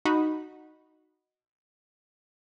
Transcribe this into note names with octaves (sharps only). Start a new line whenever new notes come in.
D#4 F#4 B5